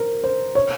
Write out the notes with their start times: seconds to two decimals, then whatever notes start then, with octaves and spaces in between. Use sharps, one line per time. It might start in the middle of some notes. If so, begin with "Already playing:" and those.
Already playing: A#4 C5
0.24 C5
0.55 C#5